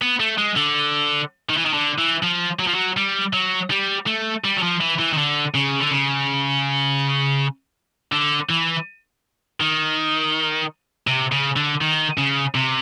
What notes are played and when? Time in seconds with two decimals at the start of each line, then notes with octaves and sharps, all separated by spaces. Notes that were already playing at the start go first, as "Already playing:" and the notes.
0.02 B3
0.20 A3
0.38 G#3
0.57 D3
1.49 D#3
1.57 E3
1.65 D#3
1.74 D3
1.98 E3
2.23 F3
2.60 F#3
2.67 F3
2.75 F#3
2.97 G3
3.33 F#3
3.70 G3
4.07 A3
4.44 G3
4.56 F#3
4.63 F3
4.80 E3
4.99 E3
5.13 D#3
5.18 D3
5.54 C#3
5.80 D3
5.91 C#3
8.12 D3
8.50 E3
9.60 D#3
11.07 C3
11.32 C#3
11.56 D3
11.81 D#3
12.18 C#3
12.55 C3